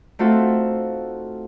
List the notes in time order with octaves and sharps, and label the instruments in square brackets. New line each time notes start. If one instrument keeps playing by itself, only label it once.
[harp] A3 C4 D#4 F4 F#4 A4